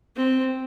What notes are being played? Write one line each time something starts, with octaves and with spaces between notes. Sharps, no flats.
C4